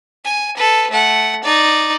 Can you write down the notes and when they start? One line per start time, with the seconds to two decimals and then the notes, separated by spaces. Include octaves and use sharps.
0.25 G#5
0.57 A4 B4
0.91 A3 F#5
1.44 D#4 D5